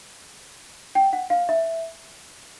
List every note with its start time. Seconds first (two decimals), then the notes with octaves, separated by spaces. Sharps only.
0.95 G5
1.13 F#5
1.30 F5
1.49 E5